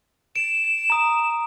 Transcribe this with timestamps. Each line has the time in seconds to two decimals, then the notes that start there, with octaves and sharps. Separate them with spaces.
0.36 D7 E7
0.90 A#5 D#6